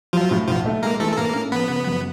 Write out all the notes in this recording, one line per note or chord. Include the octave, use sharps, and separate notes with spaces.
F3 F#3 F4
A2
B1 F3 F4
A3
G#3 A#3 A#4
E3 A3 A4
A4
A2 A#3 A#4
C#4
F3 B3 B4
C#3
F#2